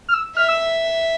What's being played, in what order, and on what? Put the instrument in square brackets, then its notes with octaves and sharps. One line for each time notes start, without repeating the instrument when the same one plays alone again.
[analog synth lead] F6
E6
[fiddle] E5 [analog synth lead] F6
[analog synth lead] E6